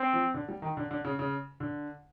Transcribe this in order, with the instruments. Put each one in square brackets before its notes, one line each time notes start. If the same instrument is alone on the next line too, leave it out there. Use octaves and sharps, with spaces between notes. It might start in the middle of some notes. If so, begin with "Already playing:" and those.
Already playing: [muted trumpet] C4
[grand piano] F3
D3
G3
D#3
D3
D3
C#3
C#3
D3